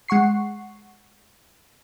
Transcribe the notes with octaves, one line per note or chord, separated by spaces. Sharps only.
G#3 F#5 C#6 C7